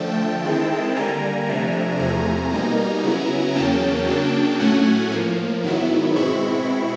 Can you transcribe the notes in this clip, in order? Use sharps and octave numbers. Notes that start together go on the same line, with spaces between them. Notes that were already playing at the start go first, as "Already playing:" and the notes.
Already playing: D3 F3 A3 G5 A5
D#3 G#3 C4 E4
D3 G3 A#3 G#5 A#5
C3 F3 A3 D4
E2 C3 F3 A3 G#5 A#5
B2 G3 A#3 D#4
C#3 F#3 B3 E4
E2 C#3 F#3 A#3 C#4 G5 A5
C#3 F#3 A#3 D4
A2 F#3 A3 C#4 F#5 G#5
A2 F3 A#3
G#2 D#3 F#3 B3 E4
B2 G#3 C4 E4 B5 C#6